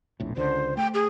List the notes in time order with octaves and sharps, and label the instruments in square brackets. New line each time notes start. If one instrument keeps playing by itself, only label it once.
[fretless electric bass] E1 A#1 A2
[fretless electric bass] C#2 D3 [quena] C5
[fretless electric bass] A3 [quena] G5
[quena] G#4